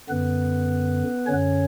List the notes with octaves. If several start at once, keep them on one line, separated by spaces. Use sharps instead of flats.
F#2 D3 B3 B4
F#2 D3 C#4 C#5